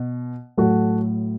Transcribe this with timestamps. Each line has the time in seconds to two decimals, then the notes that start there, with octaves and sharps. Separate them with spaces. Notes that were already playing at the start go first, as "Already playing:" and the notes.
Already playing: B2
0.57 A2 F#3 F#4 A4